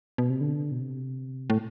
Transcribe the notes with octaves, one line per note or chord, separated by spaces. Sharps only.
B2
C3
D3
B2
C3
A2